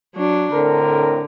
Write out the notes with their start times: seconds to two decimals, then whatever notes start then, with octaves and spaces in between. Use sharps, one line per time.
0.16 F#3 D4
0.53 A2 D3 C4 A#4